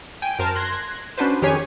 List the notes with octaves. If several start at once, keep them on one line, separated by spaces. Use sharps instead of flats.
G5 G#5
F#2 A#4 C5 A5 F6
C6 F#6 G#6 A#6
C#4 D4 F#4 B4 C5
F2 D#3 G4 G#4 C#5 G#5